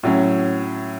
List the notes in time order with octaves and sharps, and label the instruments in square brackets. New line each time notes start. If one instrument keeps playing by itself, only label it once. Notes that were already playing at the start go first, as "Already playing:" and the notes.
[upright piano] A2 F#3 C#4